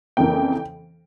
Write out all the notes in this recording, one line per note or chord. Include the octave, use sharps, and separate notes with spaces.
F2 C#3 E3 A#3 G5